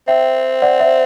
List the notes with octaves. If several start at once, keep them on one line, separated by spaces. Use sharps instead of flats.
C4 E5 G5
D5 F#5
C5 E5